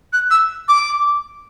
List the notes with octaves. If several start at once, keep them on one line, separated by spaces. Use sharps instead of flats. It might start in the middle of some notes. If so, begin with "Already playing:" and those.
F#6
E6
D6